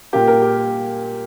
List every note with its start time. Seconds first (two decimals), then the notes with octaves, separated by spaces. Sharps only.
0.13 A#2 A#3 G4
0.28 A#4
0.42 G4